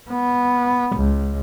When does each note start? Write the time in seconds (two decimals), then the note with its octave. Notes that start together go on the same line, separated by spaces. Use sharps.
0.10 B3
0.97 C#2